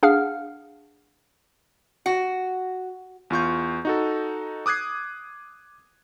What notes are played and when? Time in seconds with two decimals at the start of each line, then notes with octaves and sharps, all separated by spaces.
0.03 D4 G#4 F5 F#5 F6
2.06 F#4
3.30 E2 F4 C#6 G6
3.85 D#4 F#4 A4
4.66 D6 D#6 F#6 G#6 C7